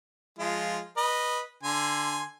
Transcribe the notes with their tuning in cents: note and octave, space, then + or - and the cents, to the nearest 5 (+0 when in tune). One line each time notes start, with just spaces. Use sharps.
F3 +0 G#3 +0 F4 -10
B4 -15 D#5 -10
D3 +10 G#5 +0 C6 +0